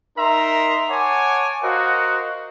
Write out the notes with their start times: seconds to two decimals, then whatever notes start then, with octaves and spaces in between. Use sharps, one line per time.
0.18 D#4 A#4 E5 A#5 C6
0.90 C#5 F#5 G#5 A5 D6
1.63 F#4 A#4 C5 D#5 F5 F#5